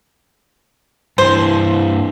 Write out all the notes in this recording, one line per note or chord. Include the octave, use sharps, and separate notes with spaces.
G2 E3 C5